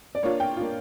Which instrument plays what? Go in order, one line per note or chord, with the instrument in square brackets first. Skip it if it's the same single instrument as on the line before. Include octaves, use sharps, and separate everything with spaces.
[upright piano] D5
[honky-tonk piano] A#3 D4 F4 [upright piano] C#5
[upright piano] G5
[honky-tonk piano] A#3 D4 F4